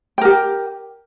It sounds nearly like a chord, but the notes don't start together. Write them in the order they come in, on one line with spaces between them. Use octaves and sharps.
G5 A#4 G4